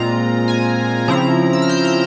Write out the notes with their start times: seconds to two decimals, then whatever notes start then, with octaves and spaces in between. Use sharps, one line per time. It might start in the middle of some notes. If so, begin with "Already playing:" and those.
Already playing: A#2 G#3 C4 F4 A#5
0.48 G#5
1.08 C#3 F3 C4 E4 A#5
1.53 E6
1.62 F6
1.69 G6
1.85 G6